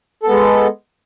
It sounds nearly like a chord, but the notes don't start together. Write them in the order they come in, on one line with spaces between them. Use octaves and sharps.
A4 B3 G#3